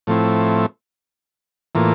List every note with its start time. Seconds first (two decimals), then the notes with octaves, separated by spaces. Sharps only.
0.07 A2 F3 A3 C4 E4
1.75 A2 E3 A#3 F4